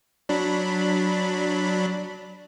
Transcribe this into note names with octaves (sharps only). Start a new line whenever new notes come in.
F#3 D4 B5